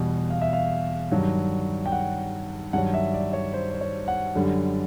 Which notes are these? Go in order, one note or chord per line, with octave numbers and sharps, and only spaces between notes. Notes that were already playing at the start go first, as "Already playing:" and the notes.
Already playing: E2 B2 G3
F5
E5
F5
G2 D#3 F#3
G5
F#5
G2 D#3 F#3 F#5
E5
D5
C#5
C5
C5
C#5
F#5
F#2 D3 G3